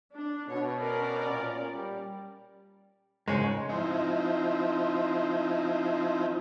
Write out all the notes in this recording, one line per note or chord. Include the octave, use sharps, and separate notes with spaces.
D4
B2 C#5
C#4 A#4 D5
A#2
G3
G#2 C#3 G#3 C#5 C6
F3 C4 D#4 E4